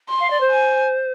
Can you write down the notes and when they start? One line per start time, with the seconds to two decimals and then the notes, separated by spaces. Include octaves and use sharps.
0.09 C6
0.20 F5
0.30 D5
0.40 C5
0.51 G#5